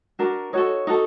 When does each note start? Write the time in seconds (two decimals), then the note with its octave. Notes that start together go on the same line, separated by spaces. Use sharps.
0.19 D4 F#4 A#4
0.53 D#4 F#4 A4 C#5
0.87 D#4 F#4 A4